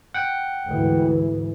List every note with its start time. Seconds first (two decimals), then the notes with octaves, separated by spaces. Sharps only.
0.14 F#5 G5
0.65 D2 G#2 E3